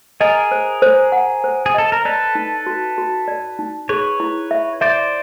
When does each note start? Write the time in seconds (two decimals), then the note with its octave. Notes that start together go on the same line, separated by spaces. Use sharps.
0.21 G#4 A#4 D#5
0.51 C5
0.82 C5
1.12 F#5
1.44 C5
1.66 G#4
1.74 A4 D#5
1.92 A#4
2.05 A4 B4 D5
2.35 D#4
2.66 F#4
2.98 F#4
3.28 D5
3.59 D#4
3.89 G#4 B4 C#5
4.20 E4
4.51 E5
4.81 C5 D5 E5